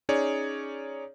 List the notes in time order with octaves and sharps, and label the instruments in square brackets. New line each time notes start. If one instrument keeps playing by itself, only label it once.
[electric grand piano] C#4 D#4 G#4 C#5 D5